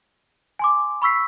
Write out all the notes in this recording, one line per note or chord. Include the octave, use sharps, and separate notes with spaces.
G#5 C6 D6
B5 C#6 E6 B6 C7